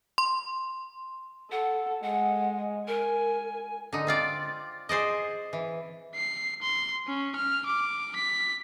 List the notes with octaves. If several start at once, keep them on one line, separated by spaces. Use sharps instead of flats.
C6
A4 F#5
G#3 F#5
A#4 G#5
D3 D#4
C4 F4 D5
G#4 C5 D5 D#5
E3
C7
C6
C#4
F6
D6
B6